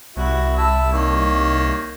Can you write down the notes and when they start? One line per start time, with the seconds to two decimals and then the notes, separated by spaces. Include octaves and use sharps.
0.16 C2 E4 F#4
0.58 E4 A5 E6
0.92 D#3 A#3 C#5